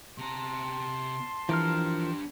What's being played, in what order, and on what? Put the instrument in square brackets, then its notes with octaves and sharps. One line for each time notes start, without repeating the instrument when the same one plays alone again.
[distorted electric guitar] C3 A#5 [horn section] A5 C6
[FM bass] E3 [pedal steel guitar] F3 A#4 F6 [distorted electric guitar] D4 G4